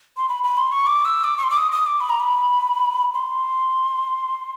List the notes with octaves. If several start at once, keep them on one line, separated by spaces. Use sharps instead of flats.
C6
B5
B5
C6
C#6
D6
E6
D6
C#6
C6
D6
D#6
D#6
D6
B5
A#5
B5
C6